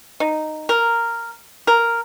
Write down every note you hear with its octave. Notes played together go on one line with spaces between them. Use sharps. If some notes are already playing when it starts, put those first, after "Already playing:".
D#4
A#4
A#4